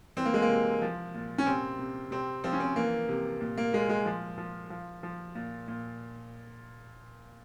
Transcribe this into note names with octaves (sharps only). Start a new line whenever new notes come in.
E3 C4
A#3
G#3
A#3
C3
F3
A#2
C#4
C3 C4
C3
C3 C4
F3 C4
C#4
C4
E3 A#3
C3
A#2
A#3
A#2 G#3
G#3
F3
F3
F3
F3
A#2
A#2